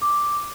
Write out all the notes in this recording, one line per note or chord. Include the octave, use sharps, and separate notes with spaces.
D6